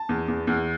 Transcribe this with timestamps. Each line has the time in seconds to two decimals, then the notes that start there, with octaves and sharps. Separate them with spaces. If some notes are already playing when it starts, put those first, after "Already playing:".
Already playing: A5
0.09 E2
0.28 E2
0.47 E2